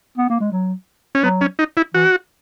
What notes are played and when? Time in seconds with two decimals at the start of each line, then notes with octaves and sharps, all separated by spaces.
0.18 B3
0.30 A#3
0.40 G#3
0.52 F#3
1.15 C#4
1.23 F#3 B3
1.41 C#4
1.59 D#4
1.77 E4
1.94 E3 F#4